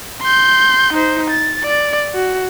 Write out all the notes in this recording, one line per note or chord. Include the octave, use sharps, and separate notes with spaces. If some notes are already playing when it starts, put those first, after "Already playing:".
C6 G6
D#4 C5
A6
D5
F#4